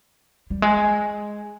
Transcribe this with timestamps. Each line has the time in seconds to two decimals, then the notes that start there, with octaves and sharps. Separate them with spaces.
0.50 G3
0.62 G#3